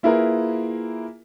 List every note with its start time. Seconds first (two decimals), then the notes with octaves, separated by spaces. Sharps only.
0.03 A#3 E4 F4 G#4 A#4 B4